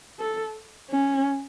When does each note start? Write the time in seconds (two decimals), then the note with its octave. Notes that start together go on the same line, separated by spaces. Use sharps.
0.19 A4
0.91 C#4